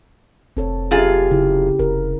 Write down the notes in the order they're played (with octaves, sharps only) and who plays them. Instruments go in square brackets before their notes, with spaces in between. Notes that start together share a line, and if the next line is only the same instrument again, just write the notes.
[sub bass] F1 [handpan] C4 A4 C#5
[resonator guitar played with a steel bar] F#2 F4 G#4 [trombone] G4
[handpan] C#3 E4
[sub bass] F1 [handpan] A#4